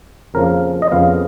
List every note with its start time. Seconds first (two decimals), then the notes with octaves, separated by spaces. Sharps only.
0.34 F2 C#3 F3 A#3 A#4
0.82 D#5
0.91 F2 C#3 F3 B3 F5